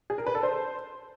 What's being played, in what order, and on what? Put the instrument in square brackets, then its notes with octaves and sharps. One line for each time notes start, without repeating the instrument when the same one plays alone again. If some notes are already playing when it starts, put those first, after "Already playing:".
[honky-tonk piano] G#4
A#4
B4
A4
C5